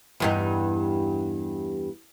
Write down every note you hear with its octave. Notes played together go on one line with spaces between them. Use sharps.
E2 G2 D#4